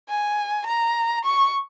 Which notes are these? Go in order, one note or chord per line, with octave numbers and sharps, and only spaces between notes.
G#5
A#5
C#6